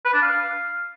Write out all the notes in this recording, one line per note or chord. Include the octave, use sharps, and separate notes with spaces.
B4
D4
F5